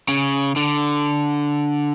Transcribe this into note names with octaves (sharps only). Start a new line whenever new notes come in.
C#3
D3